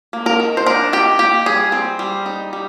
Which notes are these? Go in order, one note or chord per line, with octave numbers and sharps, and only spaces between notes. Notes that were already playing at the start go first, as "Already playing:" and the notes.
A#3
A#4
D#3
C5
D4 A#4
D#3 G4
A#3 G4
G3 G#4
C4
G3
D#4
G3